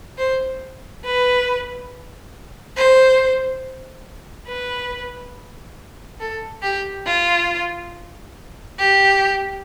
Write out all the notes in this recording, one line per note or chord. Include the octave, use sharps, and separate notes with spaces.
C5
B4
C5
B4
A4
G4
F4
G4